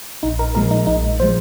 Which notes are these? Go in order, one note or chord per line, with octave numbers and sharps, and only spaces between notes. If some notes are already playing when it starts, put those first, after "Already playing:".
A#1 D#4
A#4
A#2 F3 G#3 A#4
D#4
A#1 D#4
A#2 F3 G#3 C5